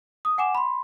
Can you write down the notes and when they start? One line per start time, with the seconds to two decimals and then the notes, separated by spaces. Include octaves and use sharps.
0.25 D#6
0.38 F#5 G#5 D6 E7
0.55 B5 C6